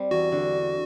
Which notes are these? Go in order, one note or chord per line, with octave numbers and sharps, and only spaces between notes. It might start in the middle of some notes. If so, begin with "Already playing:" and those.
Already playing: G3 C4
E2 F#4
D3